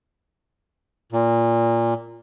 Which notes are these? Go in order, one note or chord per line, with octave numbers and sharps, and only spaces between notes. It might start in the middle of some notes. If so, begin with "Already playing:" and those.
A#2